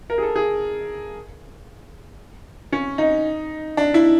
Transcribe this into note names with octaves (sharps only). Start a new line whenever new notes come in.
A#4
G#4
A4
G#4
C#4
D#4
D4
E4